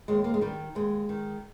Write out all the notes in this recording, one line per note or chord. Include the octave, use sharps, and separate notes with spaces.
D#2 G#3
A#3
G#3
D#3 G3
D#2 G#3
D#3